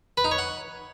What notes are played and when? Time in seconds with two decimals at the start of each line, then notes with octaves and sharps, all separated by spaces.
0.17 B4
0.24 D#4
0.31 C#5
0.38 F#5